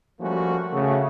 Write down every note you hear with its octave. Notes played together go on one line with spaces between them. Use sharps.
F3 G3 A3 A#3 C#4 F#4
C#3 A3 F#4